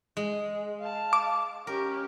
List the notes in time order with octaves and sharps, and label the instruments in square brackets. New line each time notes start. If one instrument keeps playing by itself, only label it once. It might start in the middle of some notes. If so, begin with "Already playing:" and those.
[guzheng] G#3
[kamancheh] F5 A5
[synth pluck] D6
[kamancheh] C#4 G4 [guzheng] A#4